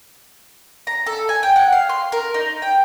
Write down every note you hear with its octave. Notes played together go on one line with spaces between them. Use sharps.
A#5
A4
G#5
G5
F#5
F5
C6
A#4
D#4
G5